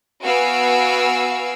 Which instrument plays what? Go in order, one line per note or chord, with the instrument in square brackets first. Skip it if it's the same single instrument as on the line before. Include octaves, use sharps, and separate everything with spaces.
[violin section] B3 F#4 F5 G#5 E6 D7